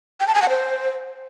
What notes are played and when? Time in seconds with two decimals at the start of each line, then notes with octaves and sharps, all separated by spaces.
0.20 G5
0.27 A5
0.35 G#5
0.42 F#5
0.49 C5